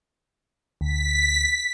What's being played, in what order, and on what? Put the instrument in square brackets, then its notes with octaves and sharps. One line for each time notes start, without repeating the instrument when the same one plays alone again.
[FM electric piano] D2 [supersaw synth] B6